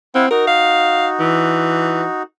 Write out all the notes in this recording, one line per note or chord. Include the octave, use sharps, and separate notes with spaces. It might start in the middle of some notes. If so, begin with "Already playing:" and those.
C4 E4 F5 F#5
D#4 F#4 A#4
F5
E3